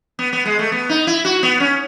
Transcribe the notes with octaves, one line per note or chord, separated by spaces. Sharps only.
B3
B3
G#3
A3
B3
D#4
E4
F#4
B3
C#4